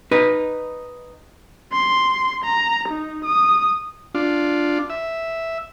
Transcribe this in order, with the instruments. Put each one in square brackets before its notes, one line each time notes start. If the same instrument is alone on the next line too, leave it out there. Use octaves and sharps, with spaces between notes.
[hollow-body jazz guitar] D#4 B4
[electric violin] C6
A#5
D#4
D#6
[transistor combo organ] D4 F4
E5